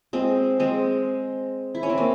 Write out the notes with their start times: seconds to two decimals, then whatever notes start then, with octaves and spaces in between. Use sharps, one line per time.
0.13 G#3 C4
0.60 G#3 C4
1.75 E4
1.83 C#4
1.90 C4
1.98 A#3